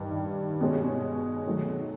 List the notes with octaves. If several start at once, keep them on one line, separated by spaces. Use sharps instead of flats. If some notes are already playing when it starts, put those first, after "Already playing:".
Already playing: G2 D#3 G3
B2 G#3 C#4
D#3 F#3 A3